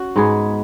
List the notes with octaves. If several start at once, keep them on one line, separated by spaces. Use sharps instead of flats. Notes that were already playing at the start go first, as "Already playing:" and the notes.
Already playing: C#4 F#4
G#2 G#3 B3 G#4